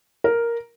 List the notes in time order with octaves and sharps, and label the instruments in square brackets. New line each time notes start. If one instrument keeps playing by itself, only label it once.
[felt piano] A#4